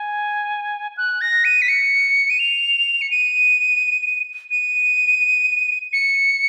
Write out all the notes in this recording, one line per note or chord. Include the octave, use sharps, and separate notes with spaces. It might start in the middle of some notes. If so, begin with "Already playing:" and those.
Already playing: G#5
F#6
A#6
D#7
B6
C#7
D#7
F7
C#7
D#7
D#7
C#7